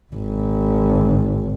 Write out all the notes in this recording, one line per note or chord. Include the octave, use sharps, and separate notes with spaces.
G#1